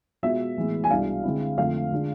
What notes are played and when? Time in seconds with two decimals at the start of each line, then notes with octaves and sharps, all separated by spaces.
0.23 B2 G#3 B3 F4 E5
0.57 A2 E3 G#3 B3
0.84 G#5
0.90 C2 B2 G#3 D4 F5
1.23 D3 G#3 C4 E4
1.58 F2 D3 A3 C4 F5
1.92 D3 G#3 D4 F4